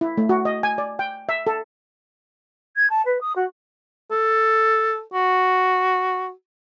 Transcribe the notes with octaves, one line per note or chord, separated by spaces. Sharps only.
E4
A3
F#4
D#5
G#5
D5
G5
E5
A4
G#6
A5
B4
D#6
F#4
A4
F#4